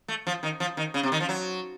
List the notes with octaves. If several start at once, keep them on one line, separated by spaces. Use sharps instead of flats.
A3
F3
D#3
F3
D#3
C#3
C3
D#3
F3
F#3